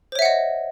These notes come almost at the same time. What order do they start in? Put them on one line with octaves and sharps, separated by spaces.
C5 C#5 E5 F#5 D#5